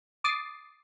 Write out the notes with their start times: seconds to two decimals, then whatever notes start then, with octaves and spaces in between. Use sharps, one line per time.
0.24 D6 D#6 A6 C7